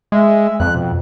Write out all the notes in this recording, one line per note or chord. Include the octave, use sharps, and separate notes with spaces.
G#3 E5
F2 F#6
B2